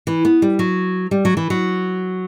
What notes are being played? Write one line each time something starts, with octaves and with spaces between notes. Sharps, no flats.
E3
B3
G3
F#3
G3
F#3
E3
F#3